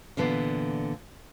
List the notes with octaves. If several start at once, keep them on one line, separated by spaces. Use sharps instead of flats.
A#2 D3 E3 B3 F5